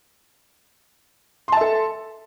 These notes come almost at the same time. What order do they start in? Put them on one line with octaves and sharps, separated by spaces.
C6 A5 E5 A4